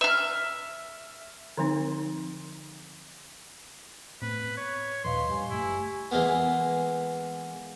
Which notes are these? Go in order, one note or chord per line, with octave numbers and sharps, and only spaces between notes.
E5 F6
D3 F3 C4 D#4
A2 B3 C4 B4
C#5
D#2 A#2 F3 B4 D#5 F5 C6
G2 G4 G#5 C#6
F#1 A3 E4
E3 G#3 A#3 B3